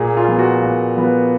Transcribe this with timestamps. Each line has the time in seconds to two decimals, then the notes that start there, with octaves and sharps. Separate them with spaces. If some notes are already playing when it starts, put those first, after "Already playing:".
Already playing: A#2 G#4
0.17 F4
0.28 F3 B3
0.39 F#4
0.62 A#2
0.97 F3 B3